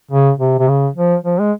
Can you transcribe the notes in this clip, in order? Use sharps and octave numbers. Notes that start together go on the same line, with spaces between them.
C#3
C3
C3
C#3
F3
F3
G#3